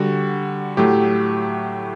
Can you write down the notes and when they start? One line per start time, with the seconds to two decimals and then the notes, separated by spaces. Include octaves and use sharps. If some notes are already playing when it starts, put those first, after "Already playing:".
Already playing: D3 G3 F#4
0.77 A2 F#3 A3 G4